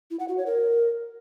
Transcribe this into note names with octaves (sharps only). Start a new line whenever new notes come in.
E4
F#5
F#4
C#5
A#4